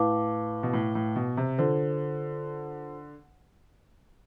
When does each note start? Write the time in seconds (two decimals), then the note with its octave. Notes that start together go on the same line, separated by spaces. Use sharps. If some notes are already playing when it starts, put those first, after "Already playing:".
Already playing: A2 E4 B4 F5 A5 D6
0.63 B2
0.73 A2
0.95 A2
1.16 B2
1.37 C3
1.58 D3 F4 A4 C5